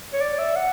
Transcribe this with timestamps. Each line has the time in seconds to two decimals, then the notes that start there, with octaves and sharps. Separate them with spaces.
0.13 C#5
0.21 D5
0.39 E5
0.56 F#5